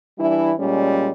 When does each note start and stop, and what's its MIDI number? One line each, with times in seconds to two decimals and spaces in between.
0.18 0.52 52
0.18 0.52 55
0.18 0.52 62
0.18 0.52 64
0.59 1.12 46
0.59 1.12 55
0.59 1.12 56
0.59 1.12 61